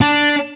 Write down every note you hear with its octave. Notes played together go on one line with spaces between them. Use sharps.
D4